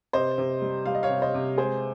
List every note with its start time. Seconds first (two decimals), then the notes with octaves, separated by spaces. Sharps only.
0.13 C3 C5 D#5
0.38 C3
0.62 G3
0.86 G3 F5
0.95 D#5
1.03 C#5 F5
1.10 C3
1.22 C5 D#5
1.34 C3
1.58 G#3 G#4 C5